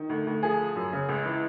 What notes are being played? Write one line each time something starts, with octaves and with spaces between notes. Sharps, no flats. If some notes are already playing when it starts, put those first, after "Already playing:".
Already playing: D#3
D2
D2
F3 G#4
F3
F#2
C#3
C#2
E3